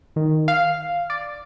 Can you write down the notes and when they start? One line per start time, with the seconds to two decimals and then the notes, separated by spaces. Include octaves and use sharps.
0.16 D#3
0.48 F5
1.10 D5